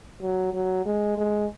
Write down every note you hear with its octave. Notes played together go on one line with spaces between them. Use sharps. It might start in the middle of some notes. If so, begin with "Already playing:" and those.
F#3
F#3
G#3
G#3